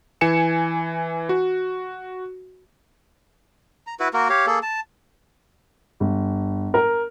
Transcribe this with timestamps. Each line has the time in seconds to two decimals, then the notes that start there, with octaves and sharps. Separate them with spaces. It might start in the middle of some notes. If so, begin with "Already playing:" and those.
0.21 E3 G#5 C#7 E7
1.29 F#4
3.87 A#5
4.00 E4 F#4 B4
4.14 A#3 F#4 A#4
4.30 G4 C#5 F5
4.47 A#3 G#4 A4
4.63 A5
6.00 G1
6.74 A#4